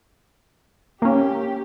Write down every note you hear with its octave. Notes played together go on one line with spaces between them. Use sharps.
A#3 C#4 G4